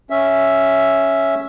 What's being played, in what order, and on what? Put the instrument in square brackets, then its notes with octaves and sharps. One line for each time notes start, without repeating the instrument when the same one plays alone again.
[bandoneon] C#4 E5